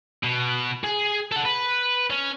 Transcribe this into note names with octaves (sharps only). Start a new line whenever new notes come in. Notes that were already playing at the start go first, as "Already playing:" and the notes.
B2
G#4
A4 F#5
B4
C#4